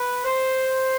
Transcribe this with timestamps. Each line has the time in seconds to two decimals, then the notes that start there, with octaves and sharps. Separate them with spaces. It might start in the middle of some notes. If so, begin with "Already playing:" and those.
Already playing: B4
0.24 C5